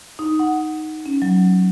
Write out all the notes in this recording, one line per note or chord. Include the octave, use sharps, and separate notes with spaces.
D#4
F#5
C#4
F#3